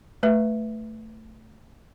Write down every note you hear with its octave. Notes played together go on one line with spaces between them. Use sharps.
A3 B4 E5